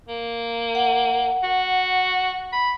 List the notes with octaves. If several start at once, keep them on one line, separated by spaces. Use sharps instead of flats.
A#3
F#5
F#4
B5